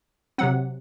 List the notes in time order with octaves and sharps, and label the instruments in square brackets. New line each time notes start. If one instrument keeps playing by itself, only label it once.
[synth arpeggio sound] C3 F#3 C4 F#5